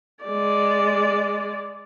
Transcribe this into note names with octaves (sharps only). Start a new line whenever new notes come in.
G#3 D5